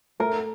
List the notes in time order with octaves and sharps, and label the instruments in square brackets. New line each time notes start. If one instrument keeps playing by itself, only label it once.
[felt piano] A3 [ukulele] A#4